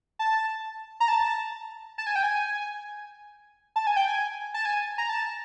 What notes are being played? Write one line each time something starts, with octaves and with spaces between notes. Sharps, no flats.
A5
A#5
A5
A5
G#5
G5
G#5
A5
G#5
G5
G#5
A5
G#5
A#5
A5